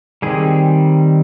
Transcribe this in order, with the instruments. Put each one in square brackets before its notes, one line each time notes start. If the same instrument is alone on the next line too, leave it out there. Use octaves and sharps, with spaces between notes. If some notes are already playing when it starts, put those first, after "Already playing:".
[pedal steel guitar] D#3 G3 C4 G#4